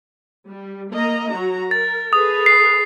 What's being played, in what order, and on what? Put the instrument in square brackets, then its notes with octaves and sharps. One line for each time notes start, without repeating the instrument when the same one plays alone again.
[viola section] G3
A#3 D#5 A#5
F#3 F#4 A#5
[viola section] A#4 [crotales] A6
[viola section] G#4 A4 B4 [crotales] D#6
[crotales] C7